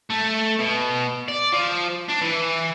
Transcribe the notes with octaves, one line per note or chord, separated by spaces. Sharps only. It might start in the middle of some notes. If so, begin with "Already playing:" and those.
A3
B2
D5
F3
D4
E3